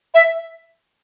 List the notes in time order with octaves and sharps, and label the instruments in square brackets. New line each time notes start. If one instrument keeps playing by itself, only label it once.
[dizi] E5